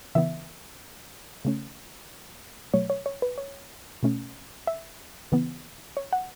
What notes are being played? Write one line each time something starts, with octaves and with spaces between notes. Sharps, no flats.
C#3 E3 B3 E5
C#3 A3 C#4
B2 F#3 A3 C#5
C#5
C#5
B4
C#5
B2 A3 C#4
E5
C#3 E3 B3
C#5
F#5